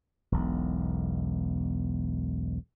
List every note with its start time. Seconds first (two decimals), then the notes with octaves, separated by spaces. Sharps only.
0.32 E1 B1